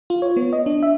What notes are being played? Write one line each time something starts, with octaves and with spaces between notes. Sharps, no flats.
F4
C#5
B3
D#5
D4
E5